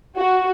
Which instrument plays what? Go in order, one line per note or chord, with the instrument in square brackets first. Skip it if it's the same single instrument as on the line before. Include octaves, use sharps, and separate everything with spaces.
[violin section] F#4